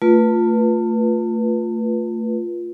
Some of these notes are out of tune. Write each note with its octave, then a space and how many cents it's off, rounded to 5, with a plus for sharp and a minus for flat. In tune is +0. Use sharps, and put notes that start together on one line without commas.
A3 +30 F4 +0 B4 -25